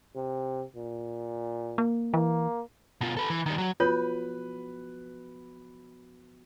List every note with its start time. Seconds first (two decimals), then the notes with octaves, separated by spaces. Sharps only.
0.16 C3
0.76 A#2
1.78 A#3
2.14 E3 A#3
3.01 B2 F4
3.17 A4 B4
3.30 E3
3.46 D#3 G3
3.58 F#3
3.80 F3 B3 F4 F#4 B4 C#5